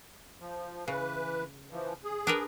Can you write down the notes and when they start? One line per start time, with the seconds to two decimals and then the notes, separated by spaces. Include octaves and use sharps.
0.40 F3
0.88 C#3 E3 B4
1.71 E3 F3
2.04 G#4
2.27 D4 A#4 B4